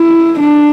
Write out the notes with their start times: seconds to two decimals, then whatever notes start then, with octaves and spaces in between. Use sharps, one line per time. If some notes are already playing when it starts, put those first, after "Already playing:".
Already playing: E4
0.40 D4